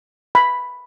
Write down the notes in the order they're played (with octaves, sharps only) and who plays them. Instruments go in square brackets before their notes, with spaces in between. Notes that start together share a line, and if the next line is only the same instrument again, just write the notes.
[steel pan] B5